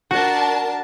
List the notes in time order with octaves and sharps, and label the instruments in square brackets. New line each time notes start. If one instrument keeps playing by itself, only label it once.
[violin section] D4 A#4 A5 [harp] F#4